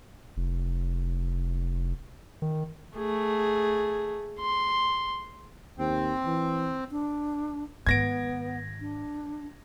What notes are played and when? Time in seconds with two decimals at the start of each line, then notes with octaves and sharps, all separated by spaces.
0.37 F1
2.42 D#3
2.96 A3 G#4
4.39 C6
5.79 D#2 C4
6.25 E3
6.91 D4
7.87 G#2 D#3 B3 G#6 A#6 D7
8.81 D4